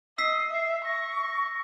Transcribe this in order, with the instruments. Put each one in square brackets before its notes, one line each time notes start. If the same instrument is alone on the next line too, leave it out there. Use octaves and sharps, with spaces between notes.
[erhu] D#5 [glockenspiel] E6 B6 [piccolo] C7
[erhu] E5
[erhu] C#6 [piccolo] A#6
[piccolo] A#6